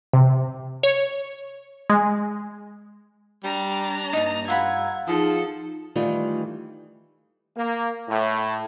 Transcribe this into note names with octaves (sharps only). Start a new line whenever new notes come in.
C3
C#5
G#3
G3 D4 A#5
G2 A#3 D#4 A5
F4 F5 F#5 A#5 B5 E6 G#6
F3 D#4 G#4 A4
D#3 E3 G3 A3 F4
A#3
A2